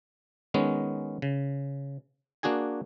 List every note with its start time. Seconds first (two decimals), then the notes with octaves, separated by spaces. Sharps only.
0.54 D#3 G#3 B3 C#4
1.22 C#3
2.43 A#3 D4 F#4 G#4 G#5